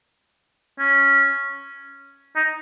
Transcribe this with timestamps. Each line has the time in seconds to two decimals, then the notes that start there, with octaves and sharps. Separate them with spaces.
0.79 C#4
2.36 D#4